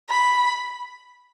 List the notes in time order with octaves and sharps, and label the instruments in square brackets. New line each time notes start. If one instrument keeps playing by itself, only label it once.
[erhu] B5